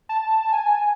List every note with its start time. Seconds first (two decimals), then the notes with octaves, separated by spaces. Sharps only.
0.09 A5
0.53 G#5